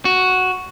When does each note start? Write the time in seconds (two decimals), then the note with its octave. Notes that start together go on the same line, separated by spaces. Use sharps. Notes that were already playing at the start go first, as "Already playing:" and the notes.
0.05 F#4